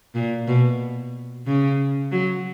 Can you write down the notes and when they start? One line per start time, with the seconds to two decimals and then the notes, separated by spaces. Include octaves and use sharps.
0.15 A#2
0.48 B2
1.47 C#3
2.12 F#3